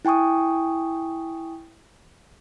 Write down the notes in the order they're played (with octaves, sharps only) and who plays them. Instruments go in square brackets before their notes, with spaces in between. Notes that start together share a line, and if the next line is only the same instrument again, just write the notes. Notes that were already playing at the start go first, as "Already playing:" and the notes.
[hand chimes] E4 G5 G#5 C#6 D#6